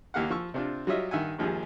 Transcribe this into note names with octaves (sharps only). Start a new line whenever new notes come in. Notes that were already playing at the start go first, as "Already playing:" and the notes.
D#2 A#3 G4 F5 F#5
F3 C#6 E6
C3 C4 D4 F4
F#3 G3 F4 C#5 D#5 E5
G2 D#3 E5 F#5 G#5
A#1 D#2 F3 G3 G#4